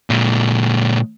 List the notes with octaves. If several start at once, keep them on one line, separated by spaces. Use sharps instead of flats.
A#2 G#3